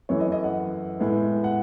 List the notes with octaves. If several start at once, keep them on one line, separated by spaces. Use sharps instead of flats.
F#2 E3 A3 C#5
D#5
D#5
F#5
A2 G#3 B3
F#5